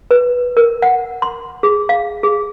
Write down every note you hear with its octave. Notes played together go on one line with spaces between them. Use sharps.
B4
A#4
F#5
C6
G#4
F5
G#4